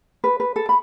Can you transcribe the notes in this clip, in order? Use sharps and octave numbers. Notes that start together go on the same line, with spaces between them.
B4
B4
A4
B5